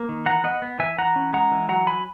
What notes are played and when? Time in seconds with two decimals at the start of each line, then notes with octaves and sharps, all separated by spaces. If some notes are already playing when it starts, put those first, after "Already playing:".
Already playing: A#3
0.09 D#3
0.26 E3 F#5 A#5
0.44 B3 D#5 F#5
0.62 B3
0.79 E3 E5 G#5
0.98 E3 F#5 A#5
1.16 C#4
1.33 G#3 F#5 A#5
1.51 E3
1.69 F#3 F#5 A#5
1.87 F#3 G#5 B5